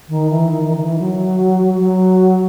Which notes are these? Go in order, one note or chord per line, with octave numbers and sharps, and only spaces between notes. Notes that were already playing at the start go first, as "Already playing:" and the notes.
D#3
E3
D#3
D#3
D#3
E3
F#3
F#3